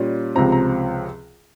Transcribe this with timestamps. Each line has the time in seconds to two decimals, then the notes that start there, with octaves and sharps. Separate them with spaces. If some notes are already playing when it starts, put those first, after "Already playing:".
Already playing: A#2 G3 C#4
0.35 C#2 C3 F3 C4 A#5
0.52 A#5